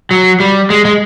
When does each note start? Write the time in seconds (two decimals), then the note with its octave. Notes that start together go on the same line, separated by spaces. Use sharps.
0.11 F#3
0.40 G3
0.70 G#3
0.85 G#3